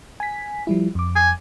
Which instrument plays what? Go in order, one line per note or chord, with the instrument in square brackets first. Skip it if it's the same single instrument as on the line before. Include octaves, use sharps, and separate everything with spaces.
[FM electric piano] G#5 B6
F3 G3 E4
F2 D6
[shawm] G#5